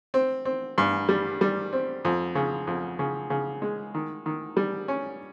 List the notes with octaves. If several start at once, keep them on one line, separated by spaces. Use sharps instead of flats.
C4
C4
G2
G3
G3
C4
F2
C#3
F2
C#3
C#3
G#3
D#3
D#3
G3
C#4